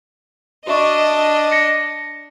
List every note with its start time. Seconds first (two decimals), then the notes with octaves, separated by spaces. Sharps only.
0.67 D4 F#4 D#5 E5 C#6
1.51 A#6 C#7